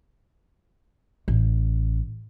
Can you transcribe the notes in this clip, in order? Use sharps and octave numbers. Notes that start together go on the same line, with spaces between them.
A1